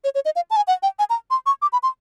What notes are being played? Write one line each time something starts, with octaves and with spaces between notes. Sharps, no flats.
C#5
C#5
D#5
F5
A5
G#5
F#5
G5
G#5
A#5
C6
C#6
D6
B5
C6